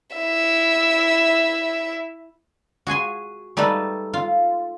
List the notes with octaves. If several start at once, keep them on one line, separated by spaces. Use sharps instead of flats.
E4 E5
F#4 G#4 G#5 C6
G3 A3 D#4 A4 B4
F4